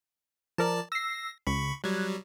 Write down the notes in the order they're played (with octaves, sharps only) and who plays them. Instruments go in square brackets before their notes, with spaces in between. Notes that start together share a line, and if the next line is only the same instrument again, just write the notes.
[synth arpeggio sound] F3 A#4 [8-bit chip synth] D5 A5
[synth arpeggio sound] E6 C7 [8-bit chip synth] A#6
[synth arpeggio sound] C#2 [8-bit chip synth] B5 C#6
[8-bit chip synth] F#3 G3 [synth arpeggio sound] F#6 G#6